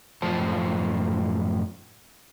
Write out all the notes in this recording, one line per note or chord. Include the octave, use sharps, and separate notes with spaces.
F#2 A2 F3 F4 C5 A5